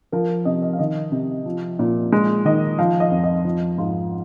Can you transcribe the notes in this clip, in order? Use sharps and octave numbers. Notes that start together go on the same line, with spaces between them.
F3 A#4
C3 D#5
D#5
F5
D#3 D#5
C3
F3
A#2
G#3
D#3 D#5
F3 F5
D#5
F2
D#5
F3
G#2 F4